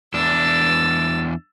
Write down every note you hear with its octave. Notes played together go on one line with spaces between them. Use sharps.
E2 D4 E6 A6